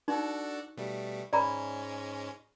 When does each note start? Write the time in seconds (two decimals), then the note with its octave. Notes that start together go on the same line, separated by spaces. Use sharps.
0.08 D4 D#4 F#4 A4
0.77 B2 G3 A3
1.33 G#2 G#3 C#4 D5 A#5 B5